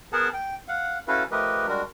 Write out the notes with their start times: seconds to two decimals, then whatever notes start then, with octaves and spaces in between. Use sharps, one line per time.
0.13 B3 G#4 A#4 F#5 A5
0.34 G5
0.68 F5 F#5
1.08 C#4 E4 F#4 A4 B4 F5
1.31 F3 A3 G4 A#4 B4 D#5
1.68 G3 G#3 D4 F#4 A#4